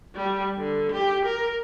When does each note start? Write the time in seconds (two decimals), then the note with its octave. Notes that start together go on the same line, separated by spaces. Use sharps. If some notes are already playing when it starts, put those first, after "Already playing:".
0.15 G3
0.59 D3
0.92 G4
1.26 A#4